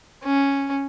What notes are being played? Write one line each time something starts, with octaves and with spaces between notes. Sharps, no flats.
C#4